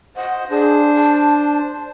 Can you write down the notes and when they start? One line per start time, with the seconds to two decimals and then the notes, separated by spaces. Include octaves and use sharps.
0.17 C5 D#5 F#5
0.50 D4 G#4 C5
0.97 A5